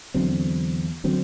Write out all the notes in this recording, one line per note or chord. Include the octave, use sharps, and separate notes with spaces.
E2 D3 F#3 C4
D3 F#3 C4